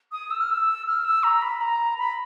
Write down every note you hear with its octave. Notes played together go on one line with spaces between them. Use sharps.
D#6
E6
F6
E6
F6
E6
A#5
B5
A#5
B5